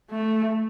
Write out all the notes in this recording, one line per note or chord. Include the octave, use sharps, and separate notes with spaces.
A3